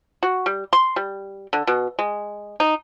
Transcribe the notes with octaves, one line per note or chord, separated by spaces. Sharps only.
F#4
G3
C6
G3
D3
B2
G#3
D#4